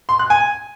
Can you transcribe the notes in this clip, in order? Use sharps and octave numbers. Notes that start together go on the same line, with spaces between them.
C6
F#6
G#5